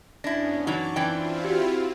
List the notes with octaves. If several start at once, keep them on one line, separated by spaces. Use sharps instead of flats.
F#2 B3 C#4 D4 E4 A#6
E3 F#3 D#4 C#6 D6
E3 C4 D4 E4 F4 G5
F#4 G4